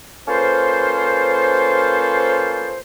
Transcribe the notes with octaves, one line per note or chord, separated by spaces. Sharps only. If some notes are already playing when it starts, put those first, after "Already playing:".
A#3 C#4 F4 A4 B4 C5